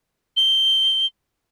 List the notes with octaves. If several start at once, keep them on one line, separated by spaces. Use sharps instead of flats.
G7